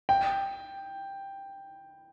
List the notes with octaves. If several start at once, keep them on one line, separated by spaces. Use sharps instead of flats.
G5